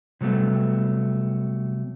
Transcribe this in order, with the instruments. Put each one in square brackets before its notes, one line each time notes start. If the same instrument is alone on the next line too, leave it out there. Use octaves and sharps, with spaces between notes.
[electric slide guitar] C3 F#3 G3 A3 B3